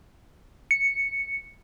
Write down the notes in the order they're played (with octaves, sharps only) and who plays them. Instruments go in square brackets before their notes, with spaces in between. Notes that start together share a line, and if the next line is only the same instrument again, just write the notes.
[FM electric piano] C#7